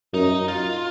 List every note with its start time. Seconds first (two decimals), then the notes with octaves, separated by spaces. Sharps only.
0.13 F#2 D#4
0.48 F4